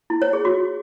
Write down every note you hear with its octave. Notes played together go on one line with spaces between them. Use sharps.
E4
C#5
G#4
F#4